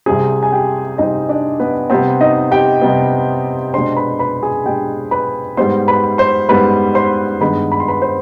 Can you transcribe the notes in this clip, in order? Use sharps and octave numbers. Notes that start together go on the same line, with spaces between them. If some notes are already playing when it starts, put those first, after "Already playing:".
C2 C3 G3 C4 G#4 G#5
G#5
G4 G5
C2 C3 G3 C4 D#4 D#5
D4 D5
B3 B4
C3 G3 B3 C4 C5
D#4 D#5
G4 G5
C3 G3 B3
B2 G#3 D4 C5 C6
B4 B5
B4 B5
G#4 G#5
B2 G#3 D4 G4 G5
B4 B5
G#2 G3 B3 C5 C6
B4 B5
C5 C6
G#2 G3 B3 B4 B5
C5 C6
G2 D#3 G#3 B3 D4 B4 B5
B5
C6
B4 B5
C5 C6